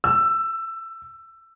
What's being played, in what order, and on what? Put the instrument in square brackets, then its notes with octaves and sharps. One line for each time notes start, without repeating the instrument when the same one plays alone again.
[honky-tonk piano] E6